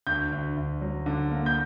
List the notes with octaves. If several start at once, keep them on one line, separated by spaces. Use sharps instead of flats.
D2 G6
D2
D2
F#3
D3
A#3
G6